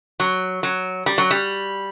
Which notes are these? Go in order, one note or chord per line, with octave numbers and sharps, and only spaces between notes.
F#3
F#3
G3
F#3
G3